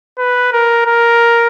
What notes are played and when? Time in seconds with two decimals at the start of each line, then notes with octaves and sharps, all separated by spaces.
0.18 B4
0.53 A#4
0.86 A#4